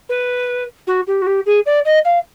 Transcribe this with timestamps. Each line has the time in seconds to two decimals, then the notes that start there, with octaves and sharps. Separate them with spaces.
0.09 B4
0.87 F#4
1.07 G4
1.22 F#4
1.26 G4
1.46 G#4
1.66 D5
1.85 D#5
2.05 F5